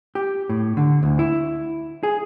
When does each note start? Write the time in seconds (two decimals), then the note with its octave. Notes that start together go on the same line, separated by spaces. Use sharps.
0.15 G4
0.49 A2
0.77 D3
1.03 D2
1.19 E4
2.03 G#4